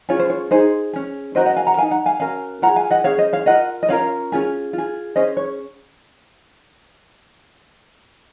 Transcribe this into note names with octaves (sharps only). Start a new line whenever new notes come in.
C#4 F4 G#4 C#5
C5
C#5
D#4 G#4 C5
C#4 G#4
C#4 F#4 A#4 C5 D#5
D#5 F#5
F5 G#5
F#5 A#5
A#4 F5 G#5
D#4
F#5 A#5
F5 G#5
C#4 F#4 A#4 F5 G#5
F4 G#4 F#5 A#5
F5 G#5
D#5 F#5
C#4 G#4 C#5 F5
C5 D#5
C#5 F5
F4 A#4 D#5 F#5
D#5
C#4 F4 A#4 C#5 F5
C#4 F4 G#4
F4 G#4
C#4 G#4 C5 D#5
C#5